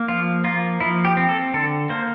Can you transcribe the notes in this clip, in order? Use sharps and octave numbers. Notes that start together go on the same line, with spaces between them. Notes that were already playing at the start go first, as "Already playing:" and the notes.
Already playing: A#3
F3 F4
A#3 F4
F3 E4
G4
C4
A4
D3 A4
A#3 C5